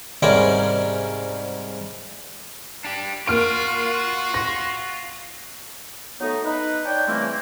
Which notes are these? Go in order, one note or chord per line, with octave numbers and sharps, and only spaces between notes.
G#2 C3 G3 C#4 A#4 C5
D4 G4
A#3 F4 F#4 F6 D7
A#6
F#3 A3 B3 D#4
D#4 B4
D4 C#5 G5
C#3 E3 G3 A3 A#3 C4